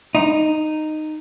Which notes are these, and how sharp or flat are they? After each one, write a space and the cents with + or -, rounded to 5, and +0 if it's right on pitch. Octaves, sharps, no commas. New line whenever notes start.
D#4 -10